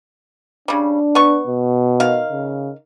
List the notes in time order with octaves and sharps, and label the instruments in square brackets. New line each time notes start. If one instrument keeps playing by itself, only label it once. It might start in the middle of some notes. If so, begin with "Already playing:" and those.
[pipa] C#3 G3 [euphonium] D4
[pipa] B3 C#6
[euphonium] B2
[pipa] D#3 F5
[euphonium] C#3